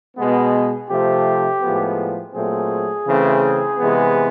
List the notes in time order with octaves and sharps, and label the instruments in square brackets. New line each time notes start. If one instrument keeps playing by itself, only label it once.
[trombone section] B2 G#3 B3
C3 F3 A3 C4 G4
A2 F3 G#3 B3
A#2 F#3 A3 C4 G#4
C#3 E3 A3 C4
C3 E3 G#3 B3